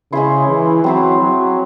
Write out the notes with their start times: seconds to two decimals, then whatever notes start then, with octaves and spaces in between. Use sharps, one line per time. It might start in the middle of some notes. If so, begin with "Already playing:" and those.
0.12 C#3 G#3 C#4 E4 C5
0.49 E3
0.84 F#3 C4 E4 C5
1.20 F#3